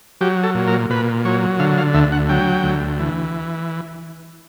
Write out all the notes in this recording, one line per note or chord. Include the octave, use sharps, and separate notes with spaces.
F#3 G4
A4
A#2
A#4
A#2 B4
F#3 C#5
D3 F5
F5
D2 E5
F#5
F#3 G5
D2
E3